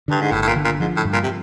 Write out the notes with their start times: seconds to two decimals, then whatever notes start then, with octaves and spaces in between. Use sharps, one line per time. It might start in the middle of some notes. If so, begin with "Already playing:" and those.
0.08 G2 D3
0.21 G#2
0.32 G1 A2
0.42 A2
0.48 A#2
0.56 D3
0.65 A#2
0.80 G#2 F3
0.96 A2
1.05 G2
1.13 A#2
1.23 C3